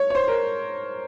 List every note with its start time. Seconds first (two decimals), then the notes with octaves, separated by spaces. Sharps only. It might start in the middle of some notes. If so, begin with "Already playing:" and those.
Already playing: C#5
0.10 C#5
0.15 C5
0.28 A#4